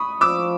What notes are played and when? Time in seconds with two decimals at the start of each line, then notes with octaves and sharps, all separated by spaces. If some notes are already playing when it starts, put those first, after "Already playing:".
Already playing: B5 C#6 D#6
0.21 F3 D6 E6